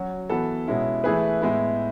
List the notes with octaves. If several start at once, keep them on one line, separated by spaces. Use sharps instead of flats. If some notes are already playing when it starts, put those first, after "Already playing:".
Already playing: F#3 C#4 F#4
E3 B3 F#4 A4
B2 G#3 C#4 E4
E3 A3 E4 G#4 B4
A2 G#3 B3 E4